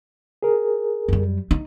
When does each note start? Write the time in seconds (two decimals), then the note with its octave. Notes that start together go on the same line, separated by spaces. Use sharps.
0.43 G#4 A#4
1.08 F#2 G3
1.51 D#4